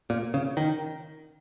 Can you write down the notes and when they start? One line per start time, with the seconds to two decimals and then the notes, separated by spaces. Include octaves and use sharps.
0.10 A#2
0.34 C#3
0.57 D#3